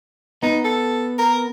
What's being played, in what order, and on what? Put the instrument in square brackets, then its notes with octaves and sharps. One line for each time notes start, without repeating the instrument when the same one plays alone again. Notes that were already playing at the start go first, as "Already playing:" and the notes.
[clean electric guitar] B3 [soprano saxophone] D#4
[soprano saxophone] A4
A#4